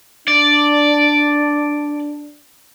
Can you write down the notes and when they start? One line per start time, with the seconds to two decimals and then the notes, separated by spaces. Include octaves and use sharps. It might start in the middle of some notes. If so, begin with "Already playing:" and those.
0.28 D4 D5